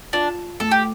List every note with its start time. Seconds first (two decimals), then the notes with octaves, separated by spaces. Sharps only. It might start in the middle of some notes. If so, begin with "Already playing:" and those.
0.13 D4 F4
0.60 A3 A4
0.71 G4